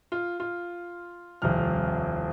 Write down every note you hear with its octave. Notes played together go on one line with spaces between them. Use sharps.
F4
F4
D#1 C2 F2 F6